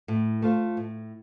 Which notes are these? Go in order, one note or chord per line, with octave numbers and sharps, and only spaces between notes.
A2
A3 F4 C5
A2